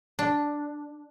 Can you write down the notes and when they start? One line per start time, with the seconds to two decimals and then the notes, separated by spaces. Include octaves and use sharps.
0.19 D4